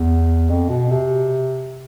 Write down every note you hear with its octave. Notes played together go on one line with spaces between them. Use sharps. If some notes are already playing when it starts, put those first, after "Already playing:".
Already playing: E2
F2
B2
C3